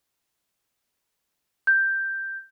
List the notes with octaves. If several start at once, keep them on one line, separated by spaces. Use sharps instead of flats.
G6